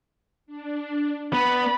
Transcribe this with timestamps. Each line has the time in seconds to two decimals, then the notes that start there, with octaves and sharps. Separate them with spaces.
0.46 D4
1.33 B3 D5 B5 A6